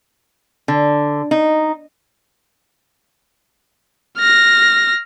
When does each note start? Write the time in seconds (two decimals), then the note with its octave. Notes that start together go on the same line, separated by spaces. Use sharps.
0.68 D3
1.31 D#4
4.18 F6 A#6